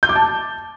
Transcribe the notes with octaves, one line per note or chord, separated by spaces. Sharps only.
G6
D6
A5